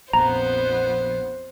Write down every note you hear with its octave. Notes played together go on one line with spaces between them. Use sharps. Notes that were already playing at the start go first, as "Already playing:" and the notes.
A#1 F2 B3 C5 A#5